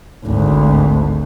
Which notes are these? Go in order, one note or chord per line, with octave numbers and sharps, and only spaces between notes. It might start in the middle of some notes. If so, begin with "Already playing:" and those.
G#1 D2